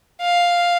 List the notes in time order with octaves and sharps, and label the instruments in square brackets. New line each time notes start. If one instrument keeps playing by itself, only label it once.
[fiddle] F5